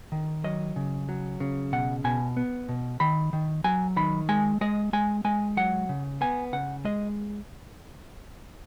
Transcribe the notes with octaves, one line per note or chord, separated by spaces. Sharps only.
D#3
F#3 D#5
C#3
F#3
C#3
B2 F#5
B2 G#5
B3
B2
D#3 B5
D#3
F#3 G#5
D#3 B5
G#3 G#5
G#3 D#5
G#3 G#5
G#3 G#5
F#3 F#5
C#3
B3 G#5
C#3 F#5
G#3 D#5